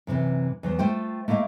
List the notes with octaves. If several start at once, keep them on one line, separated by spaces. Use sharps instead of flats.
F#2 C3 D#3 E3
E2 F#3 C5
A3 F4 C5 G5
A3 A#3 E4 D#5 F5